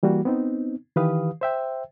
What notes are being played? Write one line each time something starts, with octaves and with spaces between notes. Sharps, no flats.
E3 G3 A#3 F#4
B3 C4 D#4
D#3 E3 G4 B4 F5 D#6
C5 E5 G5